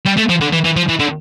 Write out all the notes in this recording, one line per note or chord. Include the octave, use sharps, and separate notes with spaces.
G3
A3
F3
D3
E3
E3
F3
E3
D3